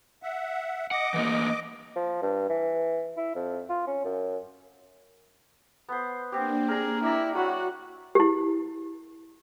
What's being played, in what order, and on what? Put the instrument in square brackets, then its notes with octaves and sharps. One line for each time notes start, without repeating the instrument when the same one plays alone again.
[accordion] E5 F#5
[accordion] D#5 D6 [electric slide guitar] F#5
[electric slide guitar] E3 A3 A#3
[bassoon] F3
G2
E3
E4
F2
F4
C#4
F#2
[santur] B3 C5
[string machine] A#3 D4 [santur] C4 G4
[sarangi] G#4 [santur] A#4 A#5
[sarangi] E4 [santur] D5 A#5 D6
[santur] F#3 B5 [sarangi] F#4 [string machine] F#6
[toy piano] E4 G4